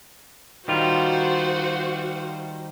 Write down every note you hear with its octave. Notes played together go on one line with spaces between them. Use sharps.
D#3 G3 F4 F#4 C5